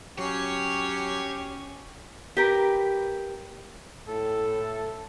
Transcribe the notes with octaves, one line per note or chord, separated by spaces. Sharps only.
F#3 C#4 G4 C#5 C7
G4 A#4 B4
A2 A4